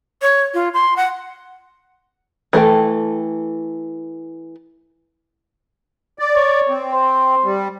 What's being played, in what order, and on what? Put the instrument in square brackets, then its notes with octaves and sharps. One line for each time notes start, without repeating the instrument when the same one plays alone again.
[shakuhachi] C#5
F4
C6
F#5
[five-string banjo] E3 A3 A4 G5
[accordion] D5
[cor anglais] C#5
[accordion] C4
[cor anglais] C5
[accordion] G3